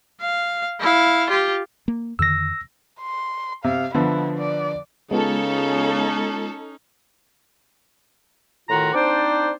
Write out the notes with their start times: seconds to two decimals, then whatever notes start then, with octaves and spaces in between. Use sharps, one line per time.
0.20 F5
0.80 E4 F5
1.30 F4 G4
1.88 A#3
2.19 F2 D3 D#3 E6 A#6
3.00 C6
3.64 C3 F5
3.94 D3 F3 B3 E4
4.38 D5
5.11 C#3 G#3 B3 C#4 D#4 F4 A4
8.69 A2 D#3 F4 F#4 A#5
8.93 C4 D4 D#4 C5 D5